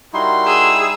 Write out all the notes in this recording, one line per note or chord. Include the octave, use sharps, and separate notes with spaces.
G3 D#4 E4 F#4 A#4 C6
G#4 E6